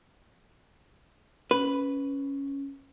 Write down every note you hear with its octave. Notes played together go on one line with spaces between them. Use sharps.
C#4 B4